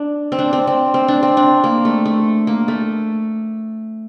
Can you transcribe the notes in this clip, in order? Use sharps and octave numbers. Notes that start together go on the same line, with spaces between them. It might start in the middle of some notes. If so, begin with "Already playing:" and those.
Already playing: D4
C4
D4
C4
C4
C4
D4
C4
D4
A#3
A3
A3
A#3
A3